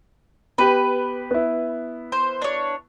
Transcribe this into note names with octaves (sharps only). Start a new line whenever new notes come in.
B3 G4 B4
B3 E4
C5
D4 C#5